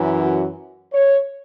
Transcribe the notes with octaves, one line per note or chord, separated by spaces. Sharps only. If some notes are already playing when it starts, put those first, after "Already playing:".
Already playing: F#2 E3
F#4
C#5